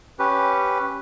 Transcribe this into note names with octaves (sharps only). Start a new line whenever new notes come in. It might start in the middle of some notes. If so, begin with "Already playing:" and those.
C#4 G4 B4